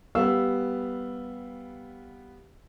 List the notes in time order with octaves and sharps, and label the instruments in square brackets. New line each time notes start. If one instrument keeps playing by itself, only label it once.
[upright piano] G3 B3 F5 E6